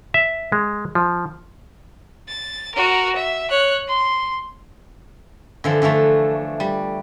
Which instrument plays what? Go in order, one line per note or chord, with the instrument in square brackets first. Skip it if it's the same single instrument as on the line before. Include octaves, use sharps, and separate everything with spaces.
[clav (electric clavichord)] E5
G#3
F3
[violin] A6
F#4 A#4
E5
C#5 F#6
C6
[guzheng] D3 E3 F3
D3 E3 F3 A3
G3